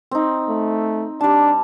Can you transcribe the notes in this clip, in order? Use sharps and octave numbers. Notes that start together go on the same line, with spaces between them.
C4 D#4
A3
G3 D4 A5